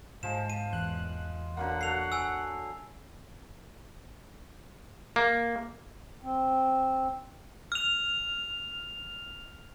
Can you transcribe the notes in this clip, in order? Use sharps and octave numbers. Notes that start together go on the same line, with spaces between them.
G#2 F3 G#3 E7
D#7
E2 F#6
D3 F#3 A#3 F#5
F#4 A4 C7 F7
G#5 E6
A#3
C4
F6 F7